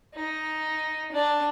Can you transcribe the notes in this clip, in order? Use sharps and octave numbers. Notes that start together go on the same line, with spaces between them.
D#4
D4